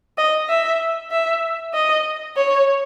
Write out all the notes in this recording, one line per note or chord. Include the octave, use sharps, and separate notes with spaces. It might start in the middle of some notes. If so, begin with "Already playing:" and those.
D#5
E5
E5
D#5
C#5